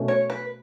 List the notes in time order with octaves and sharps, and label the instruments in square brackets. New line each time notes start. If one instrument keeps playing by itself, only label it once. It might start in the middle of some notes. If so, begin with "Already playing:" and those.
Already playing: [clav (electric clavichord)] B2 A3 C#4
[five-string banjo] C#5
B4